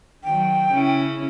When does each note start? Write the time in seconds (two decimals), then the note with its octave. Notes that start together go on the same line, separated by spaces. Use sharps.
0.24 D#3 F#3 G5
0.72 C#3 C#4 E4